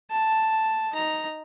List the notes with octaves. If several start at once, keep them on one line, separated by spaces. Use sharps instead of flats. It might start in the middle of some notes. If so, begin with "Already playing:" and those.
A5
D#4 A#5